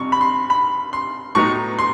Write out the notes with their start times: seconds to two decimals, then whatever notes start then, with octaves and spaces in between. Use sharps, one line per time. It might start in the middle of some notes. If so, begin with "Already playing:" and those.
Already playing: F2 C3 G3 C#6
0.12 B5
0.21 C6
0.50 B5
0.93 C6
1.35 A2 F#3 B3 D#4 C#6
1.79 C6